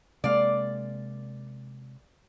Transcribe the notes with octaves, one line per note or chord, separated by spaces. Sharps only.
C3 G#3 A#3 D5 F5